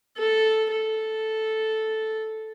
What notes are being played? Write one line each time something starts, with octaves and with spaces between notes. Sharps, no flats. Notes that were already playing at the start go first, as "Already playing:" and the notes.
A4
A4